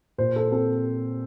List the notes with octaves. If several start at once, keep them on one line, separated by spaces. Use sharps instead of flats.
A#2 C5
A4
C4 A4